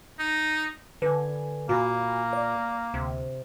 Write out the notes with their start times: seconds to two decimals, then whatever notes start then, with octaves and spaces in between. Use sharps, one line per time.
0.19 D#4
1.02 D3 B4 G#5
1.69 A#2 A#3 F#4 G#5 B5
2.33 D5
2.94 D2 C3